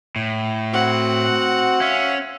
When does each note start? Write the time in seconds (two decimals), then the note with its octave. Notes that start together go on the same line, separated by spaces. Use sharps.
0.16 A2
0.73 C4 F#4 F#5
1.81 C#4 E5 F5